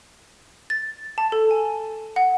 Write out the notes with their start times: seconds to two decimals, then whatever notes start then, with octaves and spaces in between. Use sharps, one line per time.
0.70 A6
1.18 A5
1.32 A4
1.51 G#5
2.16 F#5